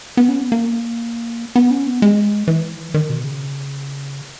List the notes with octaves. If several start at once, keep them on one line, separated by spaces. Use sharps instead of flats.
B3
C#4
B3
A#3
B3
C#4
B3
G#3
E3
D#3
B2
C#3